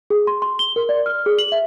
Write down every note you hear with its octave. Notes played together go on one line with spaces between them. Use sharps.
G#4
C6
C6
G7
A#4
D5
F6
G#4
F#7
E5